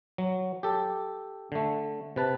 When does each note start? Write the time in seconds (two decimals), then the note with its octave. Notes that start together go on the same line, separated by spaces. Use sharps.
0.18 F#3
0.63 G4 A4
1.52 D3 A3
2.16 C3 B4 A5